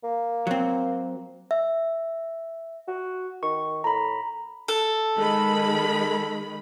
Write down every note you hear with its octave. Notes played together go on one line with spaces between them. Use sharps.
A#3
F#3 C4
E5
F#4
D#3 C#6
A2 A#5 B5
A4
D#3 G#3 B5